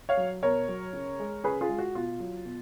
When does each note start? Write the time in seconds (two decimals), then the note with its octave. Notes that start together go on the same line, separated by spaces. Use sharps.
0.09 C#5 F5
0.17 F#3
0.43 B2 A#4 C#5
0.68 F#3
0.93 C#3
1.19 G#3
1.44 C#3 G#4 B4
1.61 F4 G#4
1.69 G#3
1.79 F#4
1.95 B2 F4
2.20 F#3
2.45 B2